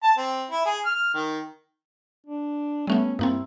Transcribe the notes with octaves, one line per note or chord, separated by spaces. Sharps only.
A5
C4
E4
G#4
F6
D#3
D4
G3 A3 B3 C#4
G2 A#3 C4 E4